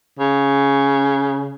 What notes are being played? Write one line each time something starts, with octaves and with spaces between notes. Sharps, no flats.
C#3